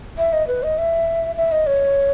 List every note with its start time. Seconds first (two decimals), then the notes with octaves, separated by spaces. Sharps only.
0.18 E5
0.33 D#5
0.47 B4
0.63 D#5
0.78 E5
1.37 E5
1.52 D#5
1.67 C#5